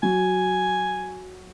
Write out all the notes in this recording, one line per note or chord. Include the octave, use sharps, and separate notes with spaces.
F#3 G#5